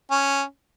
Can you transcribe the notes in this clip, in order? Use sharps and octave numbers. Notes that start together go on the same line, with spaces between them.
C#4